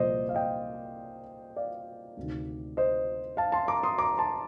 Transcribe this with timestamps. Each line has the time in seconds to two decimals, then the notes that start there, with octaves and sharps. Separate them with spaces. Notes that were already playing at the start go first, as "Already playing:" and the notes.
Already playing: C2 A#2 F3 C5 D5 D#5
0.29 F5
0.35 D#5 G5
1.56 D5 F5
2.17 D2 C3 D#3
2.77 C5 D#5
3.37 F5 A5
3.52 A5 C6
3.68 A#5 D6
3.83 C6 D#6
3.98 A#5 D6
4.18 A5 C6